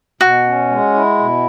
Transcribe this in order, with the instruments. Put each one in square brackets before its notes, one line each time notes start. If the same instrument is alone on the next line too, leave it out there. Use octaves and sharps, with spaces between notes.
[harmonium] B2 [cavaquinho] F#4
[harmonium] C#4
G#3
E4
B2